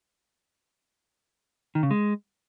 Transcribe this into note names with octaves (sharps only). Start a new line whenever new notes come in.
D#3
C#3
G#3